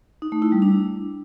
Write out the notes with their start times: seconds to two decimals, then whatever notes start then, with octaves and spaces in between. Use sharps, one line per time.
0.22 D#4
0.32 A3
0.42 E4
0.52 G3
0.62 D4